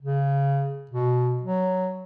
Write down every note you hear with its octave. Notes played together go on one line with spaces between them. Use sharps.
C#3
B2
F#3